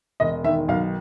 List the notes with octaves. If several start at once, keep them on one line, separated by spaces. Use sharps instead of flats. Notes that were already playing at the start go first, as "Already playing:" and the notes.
E1 D#5
D#3 E5
B1 F5